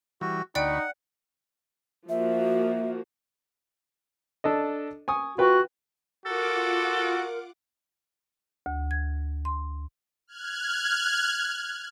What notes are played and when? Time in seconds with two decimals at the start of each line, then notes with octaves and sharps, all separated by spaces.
0.21 E3 G3 F#4
0.55 D2 D#4 D5 F#5 G5 B5 C#6 D7
2.09 F3 A#3 F#4 E5
4.44 D4 A4 D#5
5.08 G#5 C#6 D#6
5.38 F4 F#4 B4 G5
6.26 F4 F#4 A4 A#4 F#5 D6
8.66 D2
8.91 G#6
9.45 C6
10.27 F6 F#6 G#6